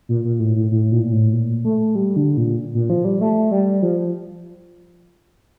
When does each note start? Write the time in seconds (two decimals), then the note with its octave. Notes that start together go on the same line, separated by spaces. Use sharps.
0.09 A#2
0.24 A#2
0.40 A2
0.56 A2
0.71 A2
0.92 A#2
1.05 A#2
1.12 A2
1.33 A#2
1.65 A3
1.95 G3
2.16 D3
2.37 A#2
2.75 A#2
2.90 F3
3.05 G3
3.21 A3
3.51 G3
3.82 F3